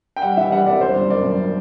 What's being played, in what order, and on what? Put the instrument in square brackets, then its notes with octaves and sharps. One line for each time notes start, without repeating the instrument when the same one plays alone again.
[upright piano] G5
G3 F#5
E3 E5
G3 F#5
C2 D5
G1 C5
G1
F#2 D5
F#2